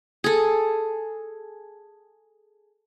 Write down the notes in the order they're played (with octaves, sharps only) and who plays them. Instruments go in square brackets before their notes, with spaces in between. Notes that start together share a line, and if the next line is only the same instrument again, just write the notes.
[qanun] G#4 A4